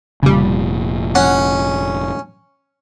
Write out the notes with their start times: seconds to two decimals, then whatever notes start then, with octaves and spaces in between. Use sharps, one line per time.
0.23 F1 A#2 C#3 G3
1.15 C#4 F#5